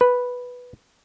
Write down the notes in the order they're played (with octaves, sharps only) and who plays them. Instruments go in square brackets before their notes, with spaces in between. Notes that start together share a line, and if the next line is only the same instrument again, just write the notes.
[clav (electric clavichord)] B4